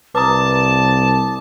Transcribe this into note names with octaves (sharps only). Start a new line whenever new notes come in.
C2 B4 A5 A#5 D6 D#6